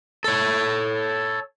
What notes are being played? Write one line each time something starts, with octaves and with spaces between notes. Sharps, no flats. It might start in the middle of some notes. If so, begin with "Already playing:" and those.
A4 C#5